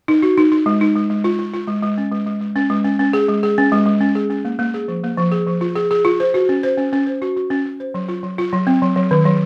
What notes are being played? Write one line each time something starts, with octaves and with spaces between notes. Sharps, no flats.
D#4
F#4
D#4
D#4
G#3
D#4
G#3
G#3
F4
F4
F4
G#3
G#3
C#4
G#3
G#3
G#3
C#4
G#3
C#4
C#4
G#4
G#3
G#4
C#4
G#3
G#3
C#4
G#4
C#4
A#3
A#3
G#4
F3
A#3
F3
G#4
F3
F4
G#4
G#4
F4
C5
F#4
C#4
C5
C#4
C#4
C5
F#4
F#4
C#4
C#4
C5
F#3
F4
F#3
F4
F#3
C4
F#3
F#3
D#3
F#3